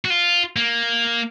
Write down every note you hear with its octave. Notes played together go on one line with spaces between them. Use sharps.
F#4
F4
A#3